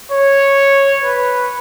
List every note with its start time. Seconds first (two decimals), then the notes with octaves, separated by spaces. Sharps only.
0.12 C#5
1.04 B4